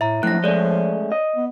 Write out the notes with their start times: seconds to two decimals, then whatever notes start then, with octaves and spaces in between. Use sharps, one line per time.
0.01 A2 E5 A#5
0.23 F#2 A2 F3 F#6 A#6
0.44 G#3 A3 C#4 C#5 D5
1.12 D#5
1.36 B3